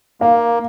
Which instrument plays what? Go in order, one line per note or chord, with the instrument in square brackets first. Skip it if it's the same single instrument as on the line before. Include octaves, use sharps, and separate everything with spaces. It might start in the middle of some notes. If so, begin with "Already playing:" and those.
[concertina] A#3 [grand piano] F5